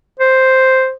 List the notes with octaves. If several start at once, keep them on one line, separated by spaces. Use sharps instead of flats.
C5